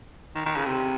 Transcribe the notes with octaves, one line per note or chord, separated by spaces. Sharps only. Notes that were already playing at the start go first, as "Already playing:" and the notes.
D#3
D#3
C#3
C3